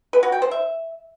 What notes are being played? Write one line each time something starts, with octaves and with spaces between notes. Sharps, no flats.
B4
F#4
G5
C5
E5